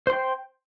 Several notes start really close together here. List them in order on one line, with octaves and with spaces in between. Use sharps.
C5 C6 G5